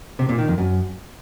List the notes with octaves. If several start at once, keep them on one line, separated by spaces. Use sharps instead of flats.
C3
A#2
D#3
F2
F#2